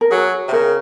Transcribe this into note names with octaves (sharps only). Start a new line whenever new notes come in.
A#4
F#3 G#4
C3
C#3 A#4